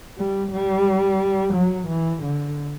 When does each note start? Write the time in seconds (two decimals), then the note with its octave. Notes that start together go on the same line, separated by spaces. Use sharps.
0.18 G3
0.52 G3
1.54 F#3
1.88 E3
2.23 D3